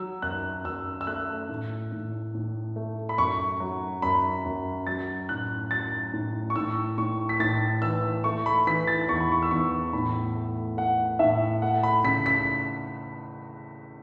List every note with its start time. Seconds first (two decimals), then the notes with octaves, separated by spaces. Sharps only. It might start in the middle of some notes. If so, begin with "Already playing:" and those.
Already playing: F#3 E6
0.22 F#2 F#6
0.65 F#2 E6
1.01 E6
1.07 A3 F#6
1.49 A2
1.92 A2
2.34 A2
2.76 A3
3.09 B5
3.18 F#2 C#6
3.60 F#3
4.02 F#2 B5
4.45 F#2
4.87 F#3 A6
5.29 A2 F#6
5.71 F#3 A6
6.13 A2
6.50 C#6
6.55 A2 E6
6.98 A2 C#6
7.29 B6
7.40 A2 A6
7.82 E3 E6
8.24 A3 C#6
8.46 B5
8.67 E3 B6
8.88 A6
9.08 E2 C#6
9.20 B5
9.32 C#6
9.42 E6
9.51 E2 C#6
9.93 A2 B5
10.35 A3
10.77 A3 F#5
11.19 A2 E5
11.62 A3 F#5
11.83 B5
12.04 C#3 B6
12.26 B6